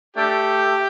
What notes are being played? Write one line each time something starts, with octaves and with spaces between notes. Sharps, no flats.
A3 D4 G4